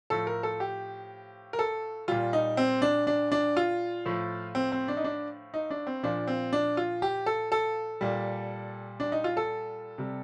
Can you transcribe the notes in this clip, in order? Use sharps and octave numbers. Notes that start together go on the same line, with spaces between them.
A2 F3 A4
A#4
A4
G4
A#4
A4
A#2 G3 F4
D#4
C4
D4
D4
D4
F4
A2 F3
C4
C4
D4
D#4
D4
D#4
D4
C4
A#2 F3 D4
C4
D4
F4
G4
A4
A4
A#2 G3
D4
D#4
F4
A4
C3 G3